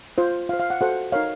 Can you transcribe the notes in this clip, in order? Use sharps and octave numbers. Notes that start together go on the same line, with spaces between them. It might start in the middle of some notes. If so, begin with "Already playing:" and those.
F4 C5
F4 C5 F5
F5
F#5
F#4 A4 C5 F#5
D#4 A#4 C#5 F5